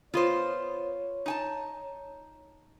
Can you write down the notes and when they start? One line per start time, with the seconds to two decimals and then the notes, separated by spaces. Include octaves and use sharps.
0.14 B3 F4 C5 C#5 D#5
1.26 D#4 G#5 A5